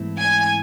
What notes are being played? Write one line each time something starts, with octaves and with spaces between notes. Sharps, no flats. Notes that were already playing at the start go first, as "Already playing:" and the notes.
Already playing: G#2 E3 A3 C4 E4
G#5